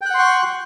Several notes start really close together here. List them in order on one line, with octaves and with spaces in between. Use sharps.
G5 F#6 F#5 C6 C#6